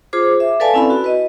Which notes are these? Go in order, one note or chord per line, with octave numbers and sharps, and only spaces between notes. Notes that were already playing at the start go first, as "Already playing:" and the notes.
F4 G#4 C5 D6
E5
A4 B4 D5 F5 G#5 A5
C4 C#4 E4 A4 B5
F#4
B4 D#5